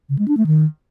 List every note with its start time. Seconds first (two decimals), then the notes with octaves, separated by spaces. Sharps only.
0.09 C#3
0.19 G#3
0.28 D4
0.37 A3
0.47 D#3